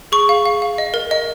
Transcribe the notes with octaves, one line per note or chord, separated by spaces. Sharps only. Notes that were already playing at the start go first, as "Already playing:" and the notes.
G#4 C#6
F5
F5
F5
D#5
A#4
D#5